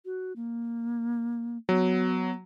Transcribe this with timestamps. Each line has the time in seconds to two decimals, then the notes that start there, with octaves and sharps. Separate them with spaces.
0.05 F#4
0.36 A#3
1.69 F#3 B3